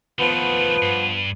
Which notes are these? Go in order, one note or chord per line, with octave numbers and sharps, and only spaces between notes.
D#3 F3 A3 B3
G2